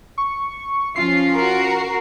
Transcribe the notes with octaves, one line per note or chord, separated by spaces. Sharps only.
C#6
F3 C#4 F4 C7
F#4 A#4